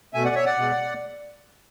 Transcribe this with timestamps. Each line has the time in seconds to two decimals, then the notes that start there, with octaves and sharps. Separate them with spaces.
0.14 B2 A3 E5 G#5
0.25 D5 F#5
0.35 C#5 E5
0.46 D5 F#5
0.56 B2 G#3